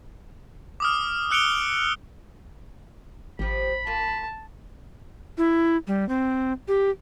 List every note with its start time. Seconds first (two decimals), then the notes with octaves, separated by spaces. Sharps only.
0.80 D6 D#6 F6
1.31 E6 F#6 C#7 D7 F7 G7
3.39 G#1 F3 G4 B5
3.87 A#3 F4 A5
5.38 E4
5.87 G3
6.09 C4
6.68 G4